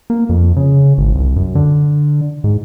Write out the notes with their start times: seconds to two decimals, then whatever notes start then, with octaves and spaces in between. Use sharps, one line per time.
0.10 A#3
0.29 F2
0.56 C#3
0.98 G#1
1.15 C2
1.36 F#2
1.55 D3
2.44 G#2